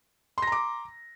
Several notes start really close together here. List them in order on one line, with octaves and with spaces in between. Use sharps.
C6 A#6 A#5 D6